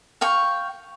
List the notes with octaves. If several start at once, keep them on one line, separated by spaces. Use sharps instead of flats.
F5 G5 C#6